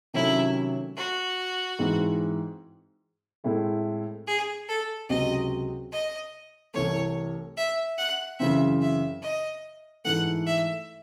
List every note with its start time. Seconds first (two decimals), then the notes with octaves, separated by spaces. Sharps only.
0.14 C3 D#3 F#3 A3 C#4 E4
0.96 F#4
1.79 G#2 E3 G#3 C4
3.44 A2 G#3 C4 E4 A4
4.27 G#4
4.69 A4
5.09 C#2 C3 F#3 C4 F#4 D#5
5.92 D#5
6.74 C2 C3 E3 A3 C#5
7.57 E5
7.98 F#5
8.39 F#2 C#3 E3 C4 E5
8.81 E5
9.22 D#5
10.05 G#2 E3 A3 F#5
10.46 E5